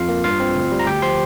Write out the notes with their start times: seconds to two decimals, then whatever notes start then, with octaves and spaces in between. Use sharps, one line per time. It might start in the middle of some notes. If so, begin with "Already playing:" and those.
Already playing: F2 F4 F5
0.09 A#3
0.24 G2 F4 F5
0.40 C4
0.55 D2
0.72 G3
0.79 A#5
0.87 D2 G4 G5
1.02 F3 C5 C6